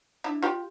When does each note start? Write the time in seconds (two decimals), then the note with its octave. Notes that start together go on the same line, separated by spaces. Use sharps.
0.24 D4 E4
0.43 F4 G4